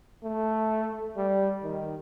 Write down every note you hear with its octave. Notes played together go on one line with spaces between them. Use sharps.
A3
G3
D#3